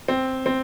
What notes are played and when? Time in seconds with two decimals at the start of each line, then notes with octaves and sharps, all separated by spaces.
0.08 C4
0.46 C4